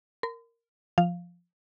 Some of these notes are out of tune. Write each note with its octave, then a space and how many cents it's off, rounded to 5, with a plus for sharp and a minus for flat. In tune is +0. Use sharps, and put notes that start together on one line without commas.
A#4 -10 C6 -45
F3 +0 F5 +0